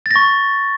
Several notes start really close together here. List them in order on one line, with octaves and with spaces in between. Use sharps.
A6 A#6 C#6